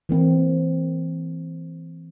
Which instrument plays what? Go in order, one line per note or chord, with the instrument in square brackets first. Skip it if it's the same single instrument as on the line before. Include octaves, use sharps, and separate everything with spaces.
[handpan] E3 A#3 C4